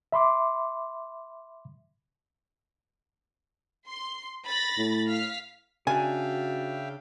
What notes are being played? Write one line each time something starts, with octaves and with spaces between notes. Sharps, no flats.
E5 B5 C6 D6
C6
B5 A6 A#6
A2
F5 F6 B6
C#3 D4 F#4 E5 F5 G5 G#5